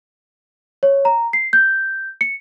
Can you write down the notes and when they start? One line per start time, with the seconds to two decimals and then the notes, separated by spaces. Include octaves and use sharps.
0.83 C#5
1.05 A#5
1.33 C7
1.53 G6
2.21 C#7